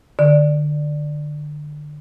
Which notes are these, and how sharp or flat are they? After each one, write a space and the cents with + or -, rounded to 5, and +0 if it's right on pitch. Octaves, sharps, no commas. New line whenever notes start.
D3 +25 D5 +10